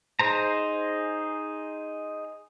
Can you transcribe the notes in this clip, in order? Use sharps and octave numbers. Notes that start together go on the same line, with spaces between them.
D#4 G#4 C5 A#5